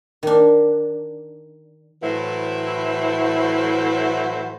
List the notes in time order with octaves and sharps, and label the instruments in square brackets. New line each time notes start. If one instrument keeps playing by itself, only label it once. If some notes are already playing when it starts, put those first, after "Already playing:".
[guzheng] D#3 D4
[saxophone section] A2 E3 F#3 E4 C5